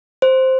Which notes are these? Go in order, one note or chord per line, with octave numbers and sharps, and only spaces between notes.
C5